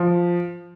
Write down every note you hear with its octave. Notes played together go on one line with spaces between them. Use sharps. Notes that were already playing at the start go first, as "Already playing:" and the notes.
Already playing: F3